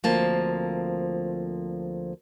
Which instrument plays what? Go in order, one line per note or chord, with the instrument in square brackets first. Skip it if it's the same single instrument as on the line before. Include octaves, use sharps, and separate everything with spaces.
[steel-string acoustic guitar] D2 F3 A#3 C4 A5